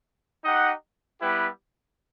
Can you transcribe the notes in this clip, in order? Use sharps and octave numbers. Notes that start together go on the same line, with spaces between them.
D#4 G4 D#5 F#5
G3 B3 E4 G4 B4